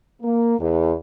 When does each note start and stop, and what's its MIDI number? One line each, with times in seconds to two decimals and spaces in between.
0.22 0.56 58
0.60 0.94 40